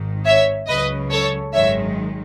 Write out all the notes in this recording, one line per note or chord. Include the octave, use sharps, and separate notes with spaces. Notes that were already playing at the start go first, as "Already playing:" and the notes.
Already playing: G#1 G#2 D#3
C#5 E5
C#2 C#3 F#3 B4 D#5
A4 C#5
G#1 F#2 D#3 G#3 C#5 E5